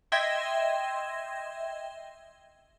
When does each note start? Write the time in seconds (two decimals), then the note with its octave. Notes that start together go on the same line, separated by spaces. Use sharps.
0.12 D#5 E5 G5 C6 G#6 A#6